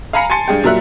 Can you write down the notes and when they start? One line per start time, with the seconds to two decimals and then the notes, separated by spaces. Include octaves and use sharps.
0.13 F5 G#5 A#5 B5 C7 C#7
0.30 G#5 A5 C6 A6 C#7
0.48 G2 G#4 G5
0.64 A#2 F#3 G3 A#4 E5 F#6